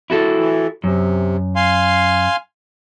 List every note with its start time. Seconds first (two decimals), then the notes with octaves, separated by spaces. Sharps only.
0.10 E4 F#4 A4
0.37 E3
0.84 F#2 C3
1.56 F5 G#5 C6